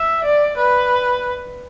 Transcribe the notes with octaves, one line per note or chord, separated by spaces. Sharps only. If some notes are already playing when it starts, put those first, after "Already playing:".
Already playing: E5
D5
B4